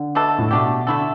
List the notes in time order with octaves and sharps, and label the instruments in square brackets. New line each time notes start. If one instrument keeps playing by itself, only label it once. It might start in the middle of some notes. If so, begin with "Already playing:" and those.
Already playing: [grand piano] D3
[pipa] B2 A3 D4 A4
[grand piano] A2
[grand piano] B2 [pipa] A3 D4 G4
[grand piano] D3 [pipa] A3 E4 A4